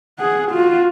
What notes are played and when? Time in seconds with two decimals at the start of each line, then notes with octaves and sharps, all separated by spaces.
0.19 G#4 F#5
0.51 F4 F#4